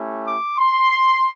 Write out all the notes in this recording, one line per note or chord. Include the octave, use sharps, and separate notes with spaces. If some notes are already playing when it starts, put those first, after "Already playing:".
Already playing: A3 C#4 E4 G4
D6
C6